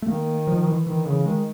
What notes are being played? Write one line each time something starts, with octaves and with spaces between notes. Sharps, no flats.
A3
D#3 A#3
F3
E3
D#3 E3
C#3 E3
D#3 G#3